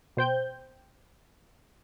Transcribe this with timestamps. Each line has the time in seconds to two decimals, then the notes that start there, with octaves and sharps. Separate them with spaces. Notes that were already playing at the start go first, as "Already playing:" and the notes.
0.17 B2 C5 G5 G6